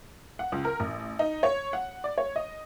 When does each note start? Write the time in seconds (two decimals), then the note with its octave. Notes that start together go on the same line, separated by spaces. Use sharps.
0.39 F#5
0.52 C#2
0.65 A#4
0.80 A1
1.19 D#4
1.43 C#5
1.73 F#5
2.04 D5
2.18 C#5
2.36 D#5